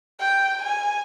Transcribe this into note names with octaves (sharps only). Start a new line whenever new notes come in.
G5
G#5